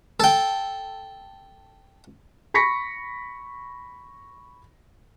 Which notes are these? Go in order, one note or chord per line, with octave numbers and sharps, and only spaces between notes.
A4 G5
B5 C#6 A#6 B6 C#7